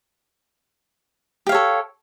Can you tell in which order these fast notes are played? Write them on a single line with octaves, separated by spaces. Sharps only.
G4 F5 C#5 A4